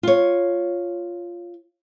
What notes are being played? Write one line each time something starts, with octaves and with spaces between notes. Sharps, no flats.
F4 C#5